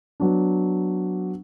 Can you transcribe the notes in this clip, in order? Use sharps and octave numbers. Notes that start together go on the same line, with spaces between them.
F#3 B3 D4